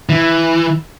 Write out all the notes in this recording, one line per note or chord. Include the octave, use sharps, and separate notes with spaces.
E3